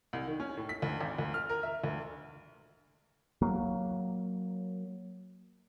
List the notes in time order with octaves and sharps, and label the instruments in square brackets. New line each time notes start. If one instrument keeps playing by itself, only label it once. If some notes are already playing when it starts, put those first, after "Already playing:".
[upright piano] C2
D#3
C#4
A2
B6
D2
G#1
D2
F6
A#4
E5
D2
[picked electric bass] F#3 A#3